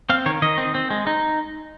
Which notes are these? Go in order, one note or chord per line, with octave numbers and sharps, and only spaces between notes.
C4 F5
D#3 C#5
D#3 D#5
C4
C4
G#3
D#4